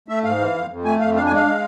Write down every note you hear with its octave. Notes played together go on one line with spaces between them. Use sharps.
A3 E5
G#2 F5
E3
F2
F2
A3 G#5
F2 F5
D4 F5
G#5
G#3
F5
G#3